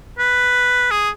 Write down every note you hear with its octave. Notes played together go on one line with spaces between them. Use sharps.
B4
G#4